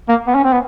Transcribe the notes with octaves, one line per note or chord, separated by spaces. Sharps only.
A#3
B3
C#4
C4
B3